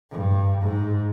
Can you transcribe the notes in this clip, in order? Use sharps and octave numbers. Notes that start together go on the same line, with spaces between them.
G2
G#2